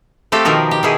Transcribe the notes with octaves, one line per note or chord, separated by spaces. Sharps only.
A3 C4 G4 A4 F5
B2 D#3 F3 A#4
G4
B2 D#3 E4 G#4